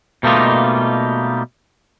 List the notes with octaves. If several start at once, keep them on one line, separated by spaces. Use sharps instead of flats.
B2 G3 A3 A#3 D#4 F4